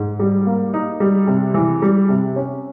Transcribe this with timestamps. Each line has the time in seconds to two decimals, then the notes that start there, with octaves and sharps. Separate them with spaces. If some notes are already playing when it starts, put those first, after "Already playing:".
Already playing: G#2
0.19 G3
0.47 A#3
0.74 D#4
1.00 G3
1.27 C3
1.54 E3
1.82 G3
2.09 C3
2.36 C#4